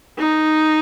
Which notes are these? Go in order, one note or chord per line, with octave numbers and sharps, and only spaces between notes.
D#4